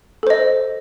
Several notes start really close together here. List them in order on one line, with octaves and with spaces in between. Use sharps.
A4 C5 D#5